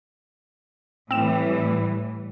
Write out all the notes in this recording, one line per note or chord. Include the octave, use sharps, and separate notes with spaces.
A2 E3 G3 C4 E7